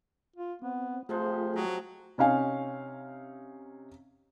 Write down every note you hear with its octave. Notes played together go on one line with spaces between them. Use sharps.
F4
B3 C4
C3 F3 G#3 A3 F4 G#4 C5
F#3 D#5 G5
C3 C#4 D#4 F5 G#5